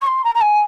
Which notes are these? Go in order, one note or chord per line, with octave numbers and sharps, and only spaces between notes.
C#6
C6
A#5
A#5
G#5